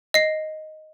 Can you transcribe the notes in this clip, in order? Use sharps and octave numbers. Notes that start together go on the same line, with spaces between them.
D#5 C7